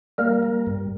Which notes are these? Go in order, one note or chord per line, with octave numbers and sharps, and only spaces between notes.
G3 A#3 A#4
G3
G2